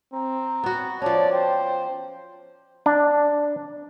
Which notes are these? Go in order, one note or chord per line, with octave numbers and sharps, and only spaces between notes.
C4 A#5
B3 F#4
F3 C#4 D5 A5
C5 G5
D4